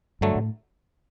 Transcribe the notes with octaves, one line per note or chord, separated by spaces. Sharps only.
G2 D3 F#3 A3
A2